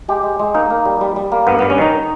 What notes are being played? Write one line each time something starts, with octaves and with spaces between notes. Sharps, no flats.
G#3 G4
G#3
G#3
A#3 D#4
A#3
G3
G3
G3
A#3
G2 B3
B3
G2
C#4
D#3 D#4